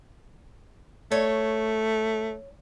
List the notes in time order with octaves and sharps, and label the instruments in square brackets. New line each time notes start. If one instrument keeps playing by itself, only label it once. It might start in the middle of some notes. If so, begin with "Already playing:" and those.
[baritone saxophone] A3 [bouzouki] C#5